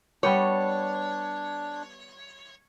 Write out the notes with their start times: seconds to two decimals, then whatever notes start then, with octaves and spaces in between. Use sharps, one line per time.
0.23 G3 B3 D4 G4 C#5